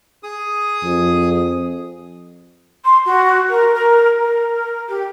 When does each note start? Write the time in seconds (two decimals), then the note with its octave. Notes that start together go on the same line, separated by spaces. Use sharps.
0.23 G#4 D#6
0.84 F2
2.84 C6
3.06 F#4
3.49 A#4
3.74 A#4
4.21 A#4
4.88 G4